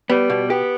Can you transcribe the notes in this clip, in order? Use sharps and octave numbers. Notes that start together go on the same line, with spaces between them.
G3 B3
B2
B3 G4